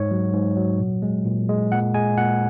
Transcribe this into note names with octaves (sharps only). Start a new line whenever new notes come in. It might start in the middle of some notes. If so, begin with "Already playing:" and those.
Already playing: G#2 C#5
F#3
G#2
F#3
A#2
G#3
A#2
G#3
A#2 F#5
G#3 G#5
A#2 F#5